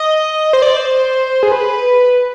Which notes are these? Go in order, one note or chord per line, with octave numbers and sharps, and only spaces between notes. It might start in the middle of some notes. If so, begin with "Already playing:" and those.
Already playing: D#5
C5
D5
C5
G#4
B4